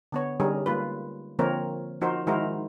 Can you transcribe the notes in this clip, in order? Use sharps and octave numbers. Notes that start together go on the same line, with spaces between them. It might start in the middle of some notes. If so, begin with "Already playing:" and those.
D3 B3 C#5
D3 G3 C#4 D#4 G#4 A#4
G3 G#3 A#3 F4 B4
D3 F3 A#3 C4 A#4 C#5
F3 D#4 F#4 A#4 C5
D#3 G#3 E4 F#4 A#4 C5